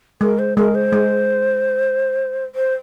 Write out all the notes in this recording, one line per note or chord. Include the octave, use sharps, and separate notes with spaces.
G#3 A#4
C5
G#3 A#4
C5
G#3
C5